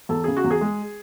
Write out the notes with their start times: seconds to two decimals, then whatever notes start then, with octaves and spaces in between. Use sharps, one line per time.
0.09 E2 A4
0.24 C#3 G#4
0.37 F#4
0.44 E2
0.51 G#4
0.61 G#3